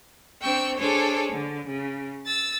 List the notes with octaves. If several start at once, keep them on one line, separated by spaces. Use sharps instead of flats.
C4 D4 G5 C#6 E6
D4 G#4 A4 C5 C#5
D3
C#3
E6 A6